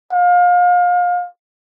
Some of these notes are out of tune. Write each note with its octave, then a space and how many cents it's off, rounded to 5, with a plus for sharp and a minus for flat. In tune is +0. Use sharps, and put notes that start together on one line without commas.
F5 +30